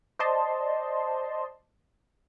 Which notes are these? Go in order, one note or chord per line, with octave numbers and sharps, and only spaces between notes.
C5 D5 D#5 A5 C6